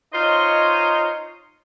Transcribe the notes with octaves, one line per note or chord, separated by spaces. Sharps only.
D#4 F4 C5 C#5 D#5